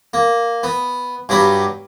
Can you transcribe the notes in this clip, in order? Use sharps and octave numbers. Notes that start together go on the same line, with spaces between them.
A#3
B3
G2 F#3 G4 B5 D6